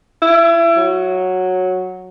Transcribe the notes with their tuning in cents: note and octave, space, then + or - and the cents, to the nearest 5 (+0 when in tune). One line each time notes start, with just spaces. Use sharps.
E4 +30
F#3 -5